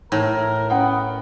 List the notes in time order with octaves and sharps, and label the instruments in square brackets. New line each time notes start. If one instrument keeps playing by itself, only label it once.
[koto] A2 [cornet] A#4
[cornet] B3 [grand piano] C#4 F#5 G5